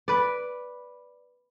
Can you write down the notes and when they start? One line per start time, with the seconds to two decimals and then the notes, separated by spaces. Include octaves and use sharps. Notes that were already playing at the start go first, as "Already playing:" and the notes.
0.08 B4 D5